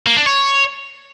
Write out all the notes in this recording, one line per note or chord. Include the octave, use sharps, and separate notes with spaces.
A#3
D4
C#5